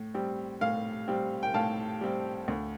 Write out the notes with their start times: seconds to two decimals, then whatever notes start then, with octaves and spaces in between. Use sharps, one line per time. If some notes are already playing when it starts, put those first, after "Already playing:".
Already playing: A2
0.14 G3 C4
0.61 A2 F5
1.08 G3 C4
1.43 G5
1.54 A2 F5 A5
2.01 G3 C4
2.48 D2